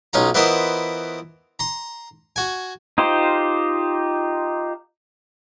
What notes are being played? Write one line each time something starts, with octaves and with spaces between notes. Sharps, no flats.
B1 C#4 D#4 F4 A#5
E3 B3 F4 A#4 C5 D#5
A#5 C6
F#4 G#5
D#4 F4 G4 C5